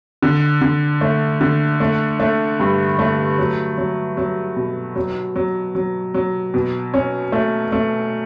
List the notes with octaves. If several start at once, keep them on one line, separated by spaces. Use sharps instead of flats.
D3
D3
A3
D3
A3
A3
G2
A3
F#3
F#3
F#3
B2
F#3
F#3
F#3
F#3
B2
C#4
A3
A3